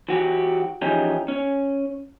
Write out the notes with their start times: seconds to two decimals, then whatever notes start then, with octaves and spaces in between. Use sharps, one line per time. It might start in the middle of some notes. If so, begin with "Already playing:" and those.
0.09 E3 F#4 G4
0.82 E3 F3 C#4 D#4 G4 G#4
1.28 C#4